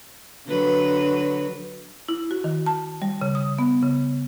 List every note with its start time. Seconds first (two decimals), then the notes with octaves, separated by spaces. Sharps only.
0.47 D3 F#3 B4
2.08 E4
2.31 F#4
2.44 D#3
2.66 A5
3.02 G3
3.21 C#3
3.35 D#6
3.58 B3
3.82 C#3